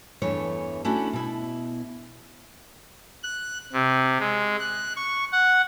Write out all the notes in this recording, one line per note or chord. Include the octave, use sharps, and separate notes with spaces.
E2 G2 E3 A3 C#5
A3 C#4 D4 E4 F#4
B2 E4
F#6
C3
G#3
F#6
C#6
F#5